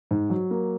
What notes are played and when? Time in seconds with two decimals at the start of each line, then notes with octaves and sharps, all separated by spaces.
0.11 G#2
0.30 F#3
0.51 A#3